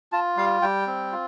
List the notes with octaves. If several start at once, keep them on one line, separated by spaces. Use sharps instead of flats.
F4 A5
G3 F5
G3 G5
C4
F4